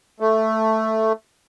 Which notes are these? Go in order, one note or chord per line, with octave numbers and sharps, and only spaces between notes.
A3